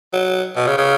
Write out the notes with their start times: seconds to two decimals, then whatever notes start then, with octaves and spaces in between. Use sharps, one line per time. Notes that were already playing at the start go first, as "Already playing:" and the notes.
0.13 F#3
0.56 B2
0.67 C#3
0.78 C#3